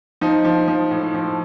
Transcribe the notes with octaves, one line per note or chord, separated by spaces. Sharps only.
F3 D#4
F3
F3
A2
F3